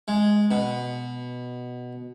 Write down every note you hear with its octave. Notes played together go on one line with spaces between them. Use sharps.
G#3
B2